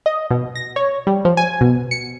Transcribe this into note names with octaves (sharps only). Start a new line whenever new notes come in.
D#5
B2
A#6
C#5
G3
F3
G#5
B2
C#7